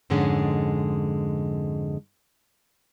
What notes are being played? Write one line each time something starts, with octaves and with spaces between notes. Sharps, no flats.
F2 G#2 D3 G#3 C#4